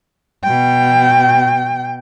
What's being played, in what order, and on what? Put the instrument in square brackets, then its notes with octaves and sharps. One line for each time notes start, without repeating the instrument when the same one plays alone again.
[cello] B2 G5